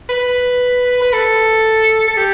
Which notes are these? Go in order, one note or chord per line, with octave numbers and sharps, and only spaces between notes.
B4
B4
A4
A4
G4